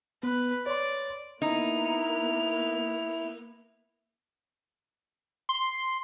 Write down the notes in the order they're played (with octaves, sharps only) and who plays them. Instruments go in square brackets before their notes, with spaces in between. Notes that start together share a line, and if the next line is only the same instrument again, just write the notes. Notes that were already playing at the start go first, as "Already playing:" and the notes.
[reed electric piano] B3 [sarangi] B4
[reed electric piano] C#5 C6 [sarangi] D5
[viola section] A#3 B3 [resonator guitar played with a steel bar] D#4 [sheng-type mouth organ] E4 [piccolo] F7
[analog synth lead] C6